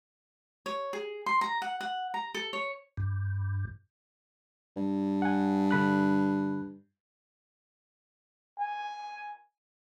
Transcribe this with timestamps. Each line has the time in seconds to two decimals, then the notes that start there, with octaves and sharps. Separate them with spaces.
0.66 C#5
0.93 G#4
1.26 C6
1.41 A#5
1.62 F#5
1.81 F#5
2.14 A#5
2.34 A4
2.53 C#5
2.97 G2
4.76 G2
5.22 F#5 G#5
5.71 D3 B5 F#6
8.59 G#5